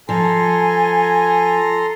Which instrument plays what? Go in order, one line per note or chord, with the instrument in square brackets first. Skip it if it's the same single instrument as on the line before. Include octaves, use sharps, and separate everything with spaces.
[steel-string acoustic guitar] F3 [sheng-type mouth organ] A4 A#5 C6 [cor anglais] G#5